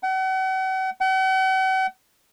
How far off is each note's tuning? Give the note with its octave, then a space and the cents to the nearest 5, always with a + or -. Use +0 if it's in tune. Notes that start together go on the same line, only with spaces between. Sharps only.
F#5 +40
F#5 +45